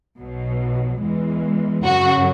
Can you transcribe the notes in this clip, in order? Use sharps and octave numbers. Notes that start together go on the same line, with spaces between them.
B1 B2 F#3
E2 E3 G#3
F#2 C#3 F#3 F#4